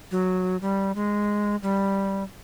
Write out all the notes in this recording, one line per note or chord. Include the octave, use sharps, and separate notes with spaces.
F#3
G3
G#3
G3